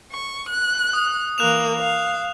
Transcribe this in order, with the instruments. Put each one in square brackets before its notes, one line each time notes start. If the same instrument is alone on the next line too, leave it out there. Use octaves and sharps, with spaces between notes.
[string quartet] C#6
F#6
[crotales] D#6
[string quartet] E3 A#3 [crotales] F#6 E7 F7
[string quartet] F5